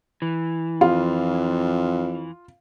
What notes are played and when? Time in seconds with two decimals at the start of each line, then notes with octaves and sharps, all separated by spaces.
0.22 E3
0.81 F2 F4